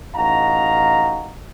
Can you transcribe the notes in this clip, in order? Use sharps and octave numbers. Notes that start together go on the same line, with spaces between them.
A1 D#4 F#4 D#5 F5 A#5